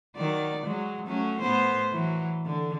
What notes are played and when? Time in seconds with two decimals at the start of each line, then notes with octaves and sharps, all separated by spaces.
0.16 D#3 F#3 D5
0.64 F#3 G#3
1.07 F#3 A3 C#4
1.40 A2 B3 C5
1.92 E3 F#3
2.46 D3